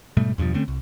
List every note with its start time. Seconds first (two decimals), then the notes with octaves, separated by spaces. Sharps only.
0.17 G#2 B2 G3 A3
0.38 E2 G2 B2 F3
0.55 D3 A3 C4 C#4
0.68 C2